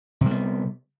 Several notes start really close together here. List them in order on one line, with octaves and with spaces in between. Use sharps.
C3 G3 B3